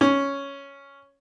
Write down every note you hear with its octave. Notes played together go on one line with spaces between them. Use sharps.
C#4